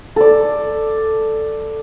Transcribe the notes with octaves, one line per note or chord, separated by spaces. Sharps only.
A4 D5